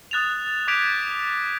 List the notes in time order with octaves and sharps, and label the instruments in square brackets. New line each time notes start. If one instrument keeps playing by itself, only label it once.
[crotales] D#6 F#6 A6 E7 F7
D6 G6 G#6 B6 D7 F7